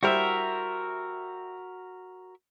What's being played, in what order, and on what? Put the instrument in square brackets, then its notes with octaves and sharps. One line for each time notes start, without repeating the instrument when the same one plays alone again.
[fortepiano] G3 E4 C5 [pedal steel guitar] F#4 A#4 E5